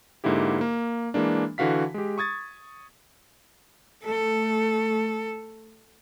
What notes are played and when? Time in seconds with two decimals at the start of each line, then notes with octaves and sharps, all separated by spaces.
0.24 G#2 D3 A#3 E4 G4
0.61 A#3
1.14 E3 G#3 A#3 D4
1.58 D3 E3 F#4 F5 B6
1.94 G#3 G4
2.18 C#6 D#6 G#6 A6
4.05 A3 A4